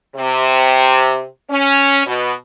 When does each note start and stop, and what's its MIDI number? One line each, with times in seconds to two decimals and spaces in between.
0.16 1.24 48
1.49 2.04 61
2.06 2.31 47